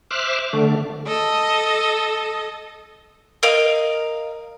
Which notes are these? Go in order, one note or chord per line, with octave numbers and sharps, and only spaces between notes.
C5 E5 D6 F6 F#6
D3 A3
A4 D#5
A#4 D#5 F5